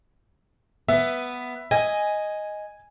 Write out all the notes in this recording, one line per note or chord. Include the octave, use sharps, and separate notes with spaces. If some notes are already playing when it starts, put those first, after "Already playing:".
B3 B4 E5
D#5 G#5